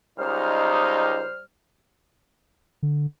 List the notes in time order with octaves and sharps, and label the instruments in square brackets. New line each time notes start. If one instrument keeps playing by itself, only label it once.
[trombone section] C#2 D#4 [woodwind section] G3 C5 F6
[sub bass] D3